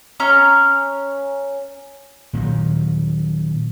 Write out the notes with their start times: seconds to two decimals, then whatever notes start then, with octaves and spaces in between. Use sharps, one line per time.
0.20 C#4 A#5 C#6 F6
2.33 A#2 D#3 F#3